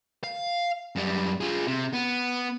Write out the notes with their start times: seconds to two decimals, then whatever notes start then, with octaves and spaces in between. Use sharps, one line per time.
0.24 F5
0.96 F#2 G3
1.41 F4 G#4
1.67 C3
1.93 B3